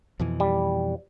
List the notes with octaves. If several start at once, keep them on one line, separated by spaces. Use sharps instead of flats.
F2 B2 E3
G3